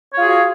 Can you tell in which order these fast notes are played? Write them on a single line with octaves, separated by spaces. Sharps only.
C#5 F4 G#4 F#4 F5